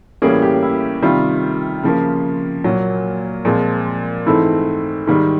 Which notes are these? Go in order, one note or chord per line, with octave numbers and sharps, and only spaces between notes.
A2 E3 G3 A#3 C#4 G#4
G4
E4
C3 D#3 G3 F4
C#3 F3 A#3
A#2 F#3 A#3
A#2 F3 G#3 C4
G#2 E3 A3 C4 E4
G#2 D#3 G3